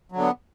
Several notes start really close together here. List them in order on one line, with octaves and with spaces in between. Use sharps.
F#3 D3 B3